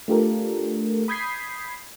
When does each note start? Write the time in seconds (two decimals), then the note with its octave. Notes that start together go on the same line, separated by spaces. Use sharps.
0.08 A3 D4 F4 G4 A4 A#4
1.08 B5 D#6 G6 G#6 B6 C7